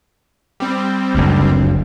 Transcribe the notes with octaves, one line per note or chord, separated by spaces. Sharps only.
G3 C4
F#1 D2